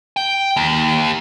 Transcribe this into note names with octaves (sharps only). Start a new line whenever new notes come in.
G5
D#2